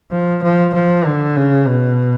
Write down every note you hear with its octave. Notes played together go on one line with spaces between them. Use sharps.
F3
F3
F3
D3
C#3
B2